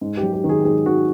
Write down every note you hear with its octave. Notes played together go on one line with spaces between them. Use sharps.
G#2
G4
F#3
G4
D#3
G#4
G#2 G#4
D#3 F#4